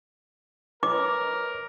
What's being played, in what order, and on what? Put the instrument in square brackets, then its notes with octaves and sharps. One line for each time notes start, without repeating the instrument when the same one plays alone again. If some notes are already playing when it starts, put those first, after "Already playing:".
[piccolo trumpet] A#4 [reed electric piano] B4 C#5 D#5 [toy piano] D6